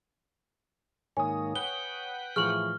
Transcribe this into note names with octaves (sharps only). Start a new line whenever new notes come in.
G#2 D#3 A#3 C#5 G#5 D#6
B4 F#5 G5 G7
A2 E3 F3 G#4 C#6 F6 F#7